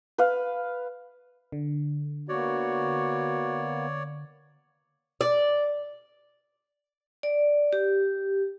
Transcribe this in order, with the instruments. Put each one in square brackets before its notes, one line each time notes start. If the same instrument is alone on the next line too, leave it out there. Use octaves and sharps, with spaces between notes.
[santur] B4 F5
[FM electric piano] D3
[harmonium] A#3 B3 [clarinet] F#4 [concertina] C#5 D5
[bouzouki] D5
[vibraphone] D5
G4